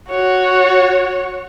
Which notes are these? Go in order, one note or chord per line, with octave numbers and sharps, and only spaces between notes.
F#4 C#5